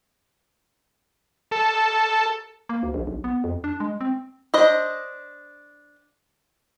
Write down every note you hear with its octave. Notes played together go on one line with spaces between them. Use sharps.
A4
A#3
D2
A#1
B1
B3
F2
D4
G#3
C4
D4 C5 D#5